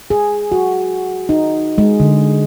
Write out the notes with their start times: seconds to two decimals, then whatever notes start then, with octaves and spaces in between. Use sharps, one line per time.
0.10 G#4
0.52 F#4
1.29 D#4
1.78 G#3
2.00 D3